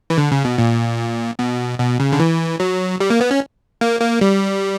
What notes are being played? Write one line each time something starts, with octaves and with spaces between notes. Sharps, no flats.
E3
D3
C#3
B2
A#2
B2
B2
C#3
D3
E3
F#3
G3
A#3
B3
C#4
A#3
A#3
G3